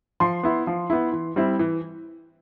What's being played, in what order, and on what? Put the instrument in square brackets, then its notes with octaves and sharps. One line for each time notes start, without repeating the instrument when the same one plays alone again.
[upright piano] F3 C6
B3 E4
F3
B3 E4
E3
G3 C4 E4
E3